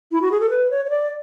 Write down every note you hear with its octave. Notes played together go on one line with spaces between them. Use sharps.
E4
F#4
G#4
A4
B4
C#5
C#5
D5